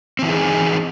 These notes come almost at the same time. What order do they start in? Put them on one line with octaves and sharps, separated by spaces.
C4 E3 E4 G#4 D#4